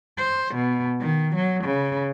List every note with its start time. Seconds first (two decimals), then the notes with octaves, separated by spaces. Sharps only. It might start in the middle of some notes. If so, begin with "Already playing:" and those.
0.18 C5
0.55 B2
1.01 D#3
1.36 F#3
1.65 C#3